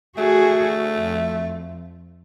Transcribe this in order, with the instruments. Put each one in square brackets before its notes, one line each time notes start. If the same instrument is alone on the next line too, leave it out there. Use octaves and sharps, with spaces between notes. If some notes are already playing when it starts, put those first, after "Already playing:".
[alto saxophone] A3 [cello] F#4 G#4
[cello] F2